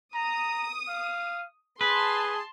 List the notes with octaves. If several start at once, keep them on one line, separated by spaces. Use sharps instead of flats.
A#5 D#6
F5
G#4 B4 A5 C6